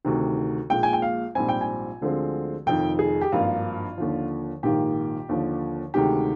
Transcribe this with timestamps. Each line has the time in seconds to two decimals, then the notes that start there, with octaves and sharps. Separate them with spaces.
0.05 D2 C3 D#3
0.70 A#1 A#2 G#3 G5
0.83 G#5
0.93 G5
1.02 F5
1.35 A#1 G#2 G3 C4 G#5
1.49 G5
1.61 G#5
2.01 D2 D3 F3 G#3 C4
2.66 F1 F2 D#3 G5
2.99 G#4
3.21 G4
3.32 G#1 G2 F3 A#3 F4
3.98 D#2 D3 F3
4.63 A#1 G#2 D#3 A#3 G4
5.29 D#2 D3 F3
5.94 D2 C3 D#3 G#3 G4